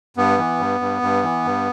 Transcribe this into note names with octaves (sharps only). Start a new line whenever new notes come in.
G2 B3
E3
G2
G2
G2
E3
G2